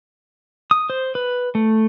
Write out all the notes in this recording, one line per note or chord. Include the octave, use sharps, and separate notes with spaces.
D#6
C5
B4
A3